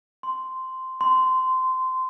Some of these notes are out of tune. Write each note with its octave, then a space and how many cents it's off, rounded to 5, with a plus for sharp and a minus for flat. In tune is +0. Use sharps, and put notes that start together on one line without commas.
C6 -10
C6 -20